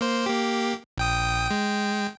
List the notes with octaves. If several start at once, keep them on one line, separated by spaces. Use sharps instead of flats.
A#3 C5
A#3 G4
A#1 G5 D#6
G#3 G5